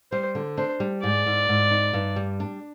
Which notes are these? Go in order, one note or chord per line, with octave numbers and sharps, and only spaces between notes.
G3 C5
D3
D4 C5
G3
G#2 D5
G#2
G#2
D#4
G2
G3
D4